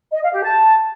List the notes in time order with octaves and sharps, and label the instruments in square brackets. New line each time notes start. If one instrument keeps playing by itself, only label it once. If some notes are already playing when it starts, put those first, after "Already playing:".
[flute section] D#5
F5
G4
A5